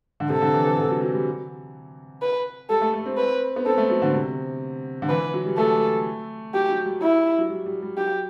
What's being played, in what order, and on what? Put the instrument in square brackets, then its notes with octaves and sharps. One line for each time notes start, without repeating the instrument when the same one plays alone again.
[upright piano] D3
[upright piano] C3 [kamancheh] A4
[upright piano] D3
E3
E3
D3
F#3
F#3
G3
[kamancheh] B4
[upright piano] G3 [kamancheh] A4
[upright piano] A3
A3
C4
[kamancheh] B4
[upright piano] B3
[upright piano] C4 [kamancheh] A4
[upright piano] A3
F#3
D3
C3
D3
[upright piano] E3 [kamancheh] B4
[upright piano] F#3
G3
[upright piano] A3 [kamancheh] A4
[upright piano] F#3 [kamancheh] G4
[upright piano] F#3
G3
[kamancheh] E4
[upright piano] F#3
G3
G3
G3
[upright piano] F#3 [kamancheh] G4